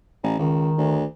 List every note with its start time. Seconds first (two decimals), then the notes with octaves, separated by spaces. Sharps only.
0.23 A1
0.39 C#2 D#3
0.78 D2